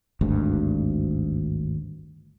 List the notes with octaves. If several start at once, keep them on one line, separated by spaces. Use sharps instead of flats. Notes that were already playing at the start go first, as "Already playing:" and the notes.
G#1 D2 G2